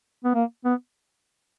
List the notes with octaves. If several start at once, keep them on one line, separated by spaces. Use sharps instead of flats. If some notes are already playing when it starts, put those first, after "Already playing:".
B3
A#3
B3